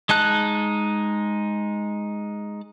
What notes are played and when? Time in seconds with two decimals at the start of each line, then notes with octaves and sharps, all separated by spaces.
0.09 G#3 D#4 A5 F#6